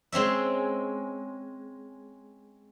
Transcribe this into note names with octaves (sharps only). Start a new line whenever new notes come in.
G#3 C4 C#4 E5